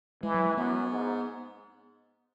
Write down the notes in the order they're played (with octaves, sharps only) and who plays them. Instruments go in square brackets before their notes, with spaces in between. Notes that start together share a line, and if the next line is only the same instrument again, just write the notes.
[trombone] E3 [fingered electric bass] G#3
[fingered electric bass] F#3
G#3
[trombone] F#2 [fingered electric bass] B3
[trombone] G#2